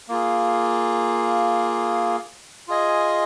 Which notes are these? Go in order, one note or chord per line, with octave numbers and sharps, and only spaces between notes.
A#3 F4 G#4
F4 G#4 D#5 G#5